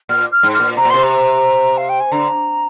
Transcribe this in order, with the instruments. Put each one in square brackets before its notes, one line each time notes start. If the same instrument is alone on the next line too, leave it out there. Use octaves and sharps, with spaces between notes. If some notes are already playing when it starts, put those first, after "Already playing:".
[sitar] A#2 [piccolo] F6
[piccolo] F6
[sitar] G#2
[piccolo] F6
[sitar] A#2
[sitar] C3 [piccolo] A#5
[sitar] A#2
[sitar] C3 [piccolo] C6
[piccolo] A#5
F5
G5
G#5
[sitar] D3 [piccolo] A#5